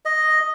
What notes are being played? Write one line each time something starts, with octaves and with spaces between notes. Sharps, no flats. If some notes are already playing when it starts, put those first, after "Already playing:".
D#5